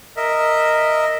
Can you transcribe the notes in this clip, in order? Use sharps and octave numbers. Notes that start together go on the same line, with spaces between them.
A#4 D#5 E5